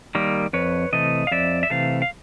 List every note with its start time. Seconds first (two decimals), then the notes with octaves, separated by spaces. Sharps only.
0.15 D#3 G3 A#3
0.53 F2 B4 C#5
0.93 C3 E3 A3 D#5
1.27 F5
1.31 F2 D5 E5
1.63 E5
1.70 C3 E3 A3 F5
2.02 F5